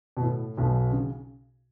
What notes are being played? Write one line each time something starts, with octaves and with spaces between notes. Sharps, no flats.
B2
A2
B1 B2
C#3